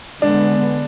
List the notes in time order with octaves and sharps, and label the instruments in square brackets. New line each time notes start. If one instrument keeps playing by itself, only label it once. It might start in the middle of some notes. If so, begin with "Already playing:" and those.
[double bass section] D3 G#3 B3 [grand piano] D4